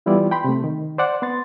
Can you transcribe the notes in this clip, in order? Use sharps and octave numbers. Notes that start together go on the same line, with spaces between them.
E3 G3 B3 E4 F4 D5
G5 B5 C6
C3 A3
D#3
C5 D5 F#5
B3 C6 A6